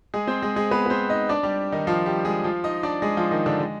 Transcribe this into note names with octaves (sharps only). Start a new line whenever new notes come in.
G#3 G#4
C4 C5
G#3 G#4
G#3 G#4
B3 B4
B4
C4 C5
D#4 D#5
D4 D5
G3 G4
D#3 D#4
F3 F4
G3 G4
G#3 G#4
F3 F4
D#4 D#5
D4 D5
G#3 G#4
F3 F4
D#3 D#4
D3 D4
G#3